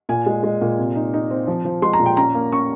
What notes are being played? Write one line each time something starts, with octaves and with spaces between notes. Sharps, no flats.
A#2 G#5
G#3
G#3
A#2
C3
D#4
D#4
C4
F3
F3
G#3 C6
A#5
A#2
G5
C#4 A#5
A#3
C#4 C#6